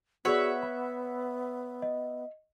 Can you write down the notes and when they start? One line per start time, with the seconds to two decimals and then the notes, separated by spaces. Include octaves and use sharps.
0.25 B3 F#4 G#4 C#5 D5 E5 F#5
0.63 B5
1.82 D#5